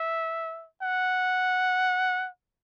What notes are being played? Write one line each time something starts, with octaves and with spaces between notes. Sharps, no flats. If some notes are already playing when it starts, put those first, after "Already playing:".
Already playing: E5
F#5